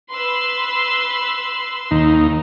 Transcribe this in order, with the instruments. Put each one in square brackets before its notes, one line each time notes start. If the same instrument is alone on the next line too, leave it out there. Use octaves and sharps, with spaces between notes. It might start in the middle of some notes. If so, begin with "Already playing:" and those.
[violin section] B4 C6 E6
[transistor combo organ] D#2 D#4